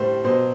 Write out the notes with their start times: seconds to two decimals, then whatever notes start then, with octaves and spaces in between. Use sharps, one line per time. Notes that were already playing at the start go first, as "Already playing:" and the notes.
Already playing: A2 G3 C5
0.24 B2 F#3 C5